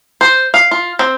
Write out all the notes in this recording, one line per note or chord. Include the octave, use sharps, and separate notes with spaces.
C5
F5
F4
C4